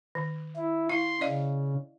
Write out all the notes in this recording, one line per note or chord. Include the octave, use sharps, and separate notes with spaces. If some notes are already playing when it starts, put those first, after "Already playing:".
D#3
E4
E4 F5 C6
C#3 D5 D#5 F5